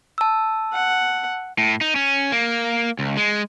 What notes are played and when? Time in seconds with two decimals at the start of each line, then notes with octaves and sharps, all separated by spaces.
0.18 A5 E6
0.73 F#5
1.58 A2
1.81 D#4
1.96 C#4
2.32 A#3
2.99 C#2
3.17 G#3